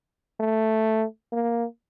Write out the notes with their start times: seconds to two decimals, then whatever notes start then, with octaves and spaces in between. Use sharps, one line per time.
0.40 A3
1.32 A#3